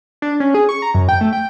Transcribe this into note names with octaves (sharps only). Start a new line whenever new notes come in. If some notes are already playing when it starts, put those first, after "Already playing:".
D4
C#4
G#4
C#6
A#5
F#2
G5
A3
G5